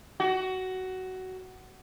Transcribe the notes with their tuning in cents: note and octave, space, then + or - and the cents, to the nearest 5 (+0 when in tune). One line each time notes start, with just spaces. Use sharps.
F#4 +15